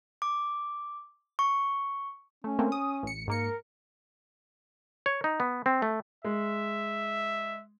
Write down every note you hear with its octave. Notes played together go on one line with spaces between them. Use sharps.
D6
C#6
A3 C#4
A3 A#3 C4
D#6
A1 C#7
G#2 A#3 A#4 C#7
C#5
D#4
B3
C4
A3
G#3 E5